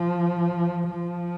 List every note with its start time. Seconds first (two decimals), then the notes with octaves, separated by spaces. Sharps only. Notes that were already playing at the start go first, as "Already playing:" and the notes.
Already playing: F3
0.91 F3